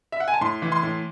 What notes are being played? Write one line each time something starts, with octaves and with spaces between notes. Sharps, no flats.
E5
F#5
G#5
A5
A2 C6
E3
C6
A2